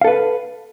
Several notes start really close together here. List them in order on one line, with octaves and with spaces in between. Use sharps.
F5 A4 B4